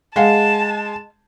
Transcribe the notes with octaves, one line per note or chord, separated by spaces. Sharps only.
G#3 D#5 F5 F#5 A5